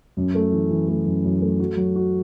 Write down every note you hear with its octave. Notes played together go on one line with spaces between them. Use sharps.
F#2
A3
E3
E3
A3
F#2
F#2
A3
F#4
F#3
F#4